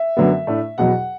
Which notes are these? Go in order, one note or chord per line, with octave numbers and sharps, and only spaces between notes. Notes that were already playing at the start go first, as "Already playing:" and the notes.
Already playing: E5
F#2 D3 F#3 B3
A2 A3 D4
E2 B2 F#3 F#5